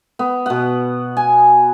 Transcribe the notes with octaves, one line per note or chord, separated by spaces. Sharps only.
B3
B2 F#5
G#5